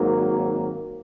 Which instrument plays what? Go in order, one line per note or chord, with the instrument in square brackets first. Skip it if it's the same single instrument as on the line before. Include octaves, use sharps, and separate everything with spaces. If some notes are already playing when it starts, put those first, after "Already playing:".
Already playing: [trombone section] G#1 G#2 D#3 F#3 A#3